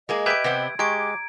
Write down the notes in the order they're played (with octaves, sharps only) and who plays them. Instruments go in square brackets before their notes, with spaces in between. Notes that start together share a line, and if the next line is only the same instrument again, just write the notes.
[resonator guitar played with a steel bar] G#3 A#3 G#4 [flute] D#5
[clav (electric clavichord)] G4 B4 E5 [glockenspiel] G#6 D7
[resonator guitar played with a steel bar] C3 B3 C4
[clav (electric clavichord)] G#3 [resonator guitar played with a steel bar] G4 [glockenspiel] A#5 G#6 D7 [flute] C#6
[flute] D6